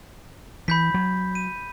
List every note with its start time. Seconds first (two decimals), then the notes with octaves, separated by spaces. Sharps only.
0.68 E3 B5 G6 B6
0.94 F#3
1.35 D#7